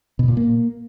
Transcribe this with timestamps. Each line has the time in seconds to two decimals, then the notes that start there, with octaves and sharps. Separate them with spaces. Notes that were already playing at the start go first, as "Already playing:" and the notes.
0.19 B2
0.28 A#2
0.37 A#3